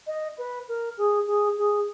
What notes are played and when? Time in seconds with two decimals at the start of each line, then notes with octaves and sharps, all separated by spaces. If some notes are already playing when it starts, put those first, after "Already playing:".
0.07 D#5
0.37 B4
0.68 A#4
0.97 G#4
1.27 G#4
1.58 G#4